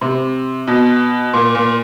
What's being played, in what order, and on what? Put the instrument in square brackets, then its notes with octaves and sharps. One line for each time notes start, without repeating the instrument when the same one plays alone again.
[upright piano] C3
B2
A#2
A#2